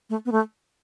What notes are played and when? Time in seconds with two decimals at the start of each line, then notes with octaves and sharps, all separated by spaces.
0.10 A3
0.26 B3
0.32 A3